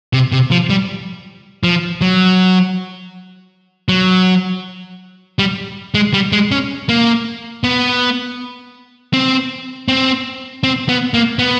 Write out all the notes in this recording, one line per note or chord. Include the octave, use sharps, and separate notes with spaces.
C3
C3
F3
G3
F3
F#3
F#3
G3
G#3
G3
G#3
C#4
A#3
B3
C4
C4
C4
B3
A#3
B3